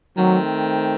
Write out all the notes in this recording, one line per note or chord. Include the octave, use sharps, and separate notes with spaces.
D#3 F#3 A3 C4